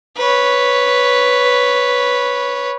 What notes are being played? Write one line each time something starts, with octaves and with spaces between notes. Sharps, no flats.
B4 C#5